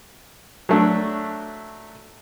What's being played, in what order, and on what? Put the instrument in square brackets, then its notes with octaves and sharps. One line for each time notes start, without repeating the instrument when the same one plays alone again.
[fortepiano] F#3 A3 D4